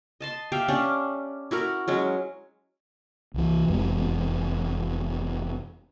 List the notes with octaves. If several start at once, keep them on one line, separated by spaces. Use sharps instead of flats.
D#5 A5 C6
G4 E5 F5 G5
C#4 D4 G4 D5
E4 F#4 A#4
F#3 G#3 C#4
C2 E3
F1 E2 G#3 C4